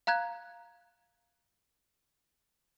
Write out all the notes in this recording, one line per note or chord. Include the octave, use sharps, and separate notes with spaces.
F5 A#5 F#6 G#6